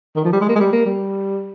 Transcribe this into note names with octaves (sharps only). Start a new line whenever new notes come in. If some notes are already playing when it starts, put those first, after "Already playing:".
D#3
F3
G3
G#3
A#3
G#3
G3
A#3
G3